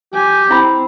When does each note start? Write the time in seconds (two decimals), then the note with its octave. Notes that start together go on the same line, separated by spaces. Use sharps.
0.14 G4 G#5
0.51 C4 E4 B5